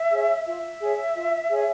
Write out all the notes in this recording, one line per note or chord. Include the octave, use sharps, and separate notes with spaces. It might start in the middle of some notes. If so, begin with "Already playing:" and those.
Already playing: E5
G#4 C#5
F4 E5
G#4 C#5
F4
G#4 C#5